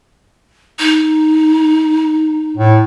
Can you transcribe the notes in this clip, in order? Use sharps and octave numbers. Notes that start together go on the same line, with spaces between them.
D#4
A2